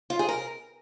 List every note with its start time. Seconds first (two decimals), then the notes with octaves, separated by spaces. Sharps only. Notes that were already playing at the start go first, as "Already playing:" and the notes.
0.10 F4
0.19 G#4
0.29 A#4